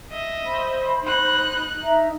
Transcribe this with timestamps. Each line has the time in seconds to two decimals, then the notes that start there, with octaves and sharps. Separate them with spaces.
0.11 D#5 E5
0.46 C5 B5
1.04 D#4 F#6
1.83 D#4 E5 A#5